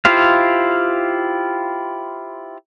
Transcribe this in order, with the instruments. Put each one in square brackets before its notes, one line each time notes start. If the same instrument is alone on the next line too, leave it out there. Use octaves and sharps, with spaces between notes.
[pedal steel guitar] E4 F4 G4 C5 F5